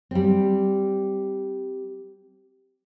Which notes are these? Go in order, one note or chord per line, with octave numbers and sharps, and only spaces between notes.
G3 C4